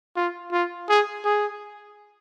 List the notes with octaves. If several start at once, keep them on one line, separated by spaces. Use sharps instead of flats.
F4
F4
G#4
G#4